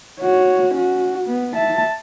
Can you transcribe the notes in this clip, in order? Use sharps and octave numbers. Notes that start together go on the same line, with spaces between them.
F#4 C#5
C#4 F#4
B3
E5 A5